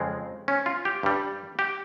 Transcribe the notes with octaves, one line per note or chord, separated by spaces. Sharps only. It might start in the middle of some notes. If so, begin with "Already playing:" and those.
Already playing: F2 C#3 G#3 C4
C#4
F4
G4
G2 G3
G4